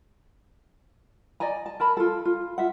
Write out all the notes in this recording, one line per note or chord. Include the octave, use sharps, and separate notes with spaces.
D5 D#5 G#5 A#5
A5
A#4 A5 B5
F4 A4
F4
F4 E5 F#5